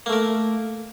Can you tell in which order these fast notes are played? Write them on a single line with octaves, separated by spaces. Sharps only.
A#3 A3 A#4